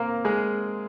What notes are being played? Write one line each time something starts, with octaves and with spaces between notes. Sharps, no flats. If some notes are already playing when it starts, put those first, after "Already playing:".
Already playing: A#3 C4 A#4
G#3 G#4